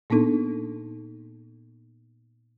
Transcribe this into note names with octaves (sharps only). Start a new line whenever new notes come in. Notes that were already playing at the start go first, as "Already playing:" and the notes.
A#2 A#3 B3 D4 D#4 A4